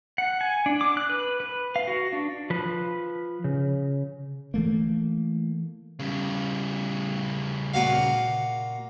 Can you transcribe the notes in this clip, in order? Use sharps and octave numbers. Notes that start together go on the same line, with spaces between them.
F#5
G#5
D4
D6
F#6
B4
B4
F5
F#4
D4
F3 B4
C#3
E3 A3 A#3
C#3 G3
A#2 F#4 F5